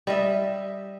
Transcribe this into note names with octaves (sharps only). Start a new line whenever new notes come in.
G3 D#5 E5